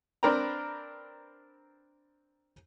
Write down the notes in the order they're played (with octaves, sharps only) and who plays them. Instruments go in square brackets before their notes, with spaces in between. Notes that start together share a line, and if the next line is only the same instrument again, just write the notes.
[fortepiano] C4 D4 A#4 B4 G5 A#5